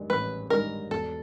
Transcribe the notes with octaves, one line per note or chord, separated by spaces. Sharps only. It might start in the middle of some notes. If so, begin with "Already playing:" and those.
Already playing: G2 D#3 G#3
A1 B4
G2 D#3 G#3 A#4
E1 A4